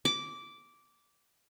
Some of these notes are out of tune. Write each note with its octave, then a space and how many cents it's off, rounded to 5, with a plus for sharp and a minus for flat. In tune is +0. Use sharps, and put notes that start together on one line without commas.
D6 -10